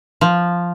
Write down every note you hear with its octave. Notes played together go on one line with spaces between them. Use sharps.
F3